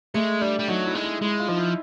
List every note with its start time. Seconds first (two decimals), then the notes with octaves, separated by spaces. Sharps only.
0.14 G#3 A3
0.41 G3 D4
0.59 G3
0.68 F#3 D#4
0.86 E4
0.95 G#3
1.04 E4
1.21 G#3 E4
1.40 F4
1.49 F3 D#4
1.57 E4